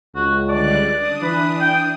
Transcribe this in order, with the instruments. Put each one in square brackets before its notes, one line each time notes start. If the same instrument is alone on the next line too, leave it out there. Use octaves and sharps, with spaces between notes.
[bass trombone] C#2 [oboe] F#4
[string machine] D3 G3 F#6 [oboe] D5
[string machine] D4 D#6
[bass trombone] E3 [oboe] B4
[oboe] G5